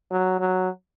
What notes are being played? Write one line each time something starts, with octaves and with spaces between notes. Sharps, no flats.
F#3
F#3